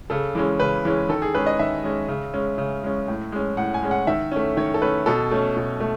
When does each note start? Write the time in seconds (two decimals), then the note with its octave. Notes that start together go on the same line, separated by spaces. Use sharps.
0.10 C#3 A4
0.35 E3 G#3 C#4
0.60 C#3 B4
0.85 E3 G#3 C#4
1.09 D#3 A4
1.22 G#4
1.35 G#3 C#4 B4
1.46 D#5
1.59 D#3 E5
1.84 G#3 C#4
2.08 C#3
2.34 G#3 C#4
2.58 C#3
2.84 G#3 C#4
3.08 A2
3.32 G#3 C#4
3.57 A2 F#5
3.74 G#5
3.83 G#3 C#4
3.91 F#5
4.07 D#3 E5
4.32 A3 C#4
4.57 D#3 C#5
4.74 A4
4.82 A3 C#4 B4
5.06 B2 A4
5.31 A3 C#4
5.57 B2
5.80 A3